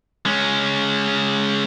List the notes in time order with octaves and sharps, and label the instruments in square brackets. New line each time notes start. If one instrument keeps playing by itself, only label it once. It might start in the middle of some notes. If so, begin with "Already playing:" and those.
[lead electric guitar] G#3 C#4